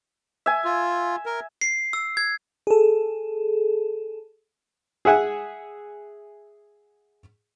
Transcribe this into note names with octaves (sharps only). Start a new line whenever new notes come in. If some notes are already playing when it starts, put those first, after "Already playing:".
E5 G#5
F4
A#4
C7
E6
G#6
G#4 A4
G#4 E5 F#5 G#5